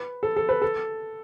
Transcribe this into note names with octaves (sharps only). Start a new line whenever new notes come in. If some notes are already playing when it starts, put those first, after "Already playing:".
Already playing: B4
A4
A4
B4
A4